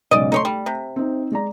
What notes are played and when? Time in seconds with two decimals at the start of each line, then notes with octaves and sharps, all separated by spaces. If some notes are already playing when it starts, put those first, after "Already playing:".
0.11 B1 G#2 C#3 D5 D#5
0.32 A3 D#4 C#5 C6
0.45 G3
0.66 C3
0.96 C4 D#4
1.32 G#3 D5 A#5